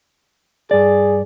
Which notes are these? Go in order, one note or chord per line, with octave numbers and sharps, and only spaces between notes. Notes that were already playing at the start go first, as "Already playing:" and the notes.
G2 G#4 D5